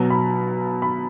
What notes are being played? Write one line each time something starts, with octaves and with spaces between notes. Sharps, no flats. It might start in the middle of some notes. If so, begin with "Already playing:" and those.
Already playing: B2 F#3 A#5
B5
B5